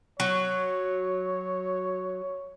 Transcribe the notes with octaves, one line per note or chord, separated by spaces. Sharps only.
F#3 C#5